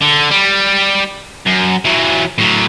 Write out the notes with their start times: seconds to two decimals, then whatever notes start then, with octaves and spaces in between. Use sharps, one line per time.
0.01 D3
0.30 G3
1.47 F#2
1.85 E3 F#3
2.38 A2 F#3